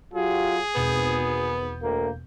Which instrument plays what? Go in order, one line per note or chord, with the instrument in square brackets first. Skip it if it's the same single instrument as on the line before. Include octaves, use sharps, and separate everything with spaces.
[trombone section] F#3 F4 G4 [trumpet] G#4
[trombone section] G#1 [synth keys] E2 B2 G6 [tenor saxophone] B3
[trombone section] D2 A#3